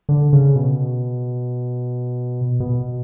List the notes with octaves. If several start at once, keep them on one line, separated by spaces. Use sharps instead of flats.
D3
C#3
B2
B2